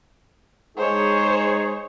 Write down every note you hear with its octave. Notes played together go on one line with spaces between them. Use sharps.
G#3 D#4 G#4 C5 C#5